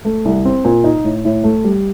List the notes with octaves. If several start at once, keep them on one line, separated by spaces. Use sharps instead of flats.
A3
C2
C4
A#2
D#4
A2
A2
A3
G3